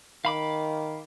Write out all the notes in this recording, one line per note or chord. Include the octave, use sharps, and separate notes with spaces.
D#3 F5 B5 D6